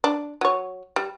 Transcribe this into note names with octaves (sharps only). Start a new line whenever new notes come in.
D4
F#3 C#5
G3